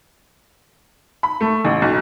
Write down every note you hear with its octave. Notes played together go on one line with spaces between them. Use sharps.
B5
A3
A1
B1